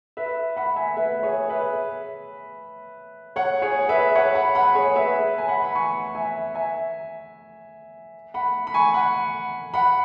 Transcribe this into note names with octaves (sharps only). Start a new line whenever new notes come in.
B4 E5
F#5 B5
E5 G#5
B4 E5
G#4 C#5
B4 E5
C#5 F#5
G#4 C#5
B4 E5
C#5 F#5
F#5 B5
F#5 B5
G#4 C#5
B4 E5
G#5
F#5 B5
B5
G#5 C#6
E5 G#5
E5 G#5
F#5 B5
B5
G#5 C#6
F#5 B5
F#5 B5